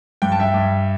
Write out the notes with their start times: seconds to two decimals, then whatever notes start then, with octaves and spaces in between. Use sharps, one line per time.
0.22 G2 G5
0.32 A5
0.40 E5 G5
0.54 G2